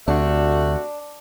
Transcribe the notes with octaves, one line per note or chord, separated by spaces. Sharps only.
D2 C3 A3 D4 F#4